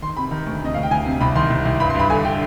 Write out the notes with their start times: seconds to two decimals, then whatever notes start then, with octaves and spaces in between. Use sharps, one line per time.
0.02 D#3 C6
0.17 C3 B5
0.31 D#3
0.46 D2
0.61 C3 D#5
0.74 D2 F5
0.83 G5
0.91 D2 G#5
1.05 C3
1.21 C2 B5
1.35 D#3 C6
1.50 C2
1.65 C2
1.80 G2 B5
1.90 C6
1.95 G2 B5
2.10 D3 G#5
2.24 D3 G5